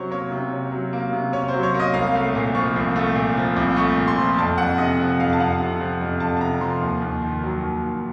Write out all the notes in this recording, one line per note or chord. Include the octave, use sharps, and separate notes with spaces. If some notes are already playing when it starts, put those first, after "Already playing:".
Already playing: C3 F#3 C#4 C5 C#5
A#3 C#5
C3
C#4
F#3
A#3
C3
C#4 C#5
C5
F#3
C#5
A#3
D#5
C2 F5
A3
A#2
F3 C#6
C2
A3
A#2
F3
C2
A3 C#6
A#2
C6
F3
F2 A5
F2 F#5
C3 D#5
F3
F2 F5
A5
F2 F#5
C3
F3
F2
F2 A5
A5
C3 A#5
F3 C6
D#2
D#2
D#3
F#3
D#2
D#2